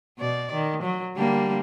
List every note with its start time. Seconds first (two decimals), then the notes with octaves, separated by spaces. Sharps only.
0.19 B2 D5
0.53 D#3
0.83 F#3
1.16 D3 G3 A#3